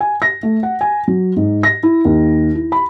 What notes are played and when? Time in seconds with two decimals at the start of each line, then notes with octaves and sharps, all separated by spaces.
0.01 G#5
0.22 A#6
0.43 A3
0.63 F#5
0.81 G#5
1.08 F#3
1.36 G#2
1.63 A#6
1.83 E4
2.05 D#2
2.55 E4
2.72 B5